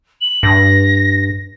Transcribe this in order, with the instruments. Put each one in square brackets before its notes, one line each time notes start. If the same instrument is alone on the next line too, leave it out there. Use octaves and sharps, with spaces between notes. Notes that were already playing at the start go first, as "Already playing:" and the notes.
[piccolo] F#7
[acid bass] G2 [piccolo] A#6